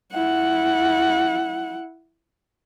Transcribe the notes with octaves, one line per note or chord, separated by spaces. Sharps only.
E4 F#5